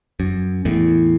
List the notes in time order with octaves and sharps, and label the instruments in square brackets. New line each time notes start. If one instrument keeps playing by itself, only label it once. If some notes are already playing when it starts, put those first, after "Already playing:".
[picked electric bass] F#2
E2 A2